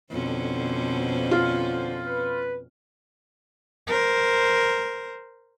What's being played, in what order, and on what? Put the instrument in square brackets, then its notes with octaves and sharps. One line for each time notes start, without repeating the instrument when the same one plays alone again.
[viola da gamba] F2 B2 C#4 [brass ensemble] D3 C5
[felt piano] F4
[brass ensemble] B4
[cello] A#4 C5